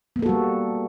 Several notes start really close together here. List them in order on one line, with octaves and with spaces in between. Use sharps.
B3 A#3 A4 F#4 G3